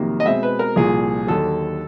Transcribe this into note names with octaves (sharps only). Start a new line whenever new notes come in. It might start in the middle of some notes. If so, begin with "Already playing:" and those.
Already playing: F2 C3 D#3 F#3 A#3
D#5
B2 G#3 C4 E5
B4
A#4
C2 A#2 F3 G#4
D#2 D3 F#3 A4